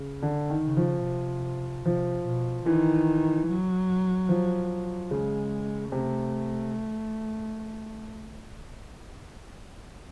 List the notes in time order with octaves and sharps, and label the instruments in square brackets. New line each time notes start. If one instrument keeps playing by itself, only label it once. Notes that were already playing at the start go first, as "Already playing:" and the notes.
Already playing: [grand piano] C#3
D3
D#3
[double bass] C#3
[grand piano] F3
[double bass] C3
[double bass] C3 [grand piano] F3
[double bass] B2
[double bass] D#3 [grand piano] E3
[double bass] F#3
[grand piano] F3
[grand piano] C#3 [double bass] G#3
[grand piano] C3 [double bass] A3